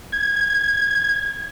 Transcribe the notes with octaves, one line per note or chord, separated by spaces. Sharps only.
G#6